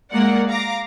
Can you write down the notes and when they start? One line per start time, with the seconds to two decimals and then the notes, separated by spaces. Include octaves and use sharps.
0.12 G#3 A#3 A#4 D5 F#5
0.48 F5 A#5 D6